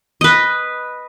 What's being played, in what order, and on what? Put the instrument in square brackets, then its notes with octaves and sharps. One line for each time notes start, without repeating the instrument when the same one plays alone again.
[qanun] B4 D#5